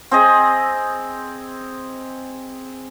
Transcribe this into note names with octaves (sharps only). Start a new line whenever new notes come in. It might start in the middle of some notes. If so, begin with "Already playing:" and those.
C4 G#4 D#5